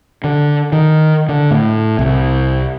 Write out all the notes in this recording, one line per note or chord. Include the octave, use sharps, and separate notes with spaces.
D3
D#3
D3
A2
C2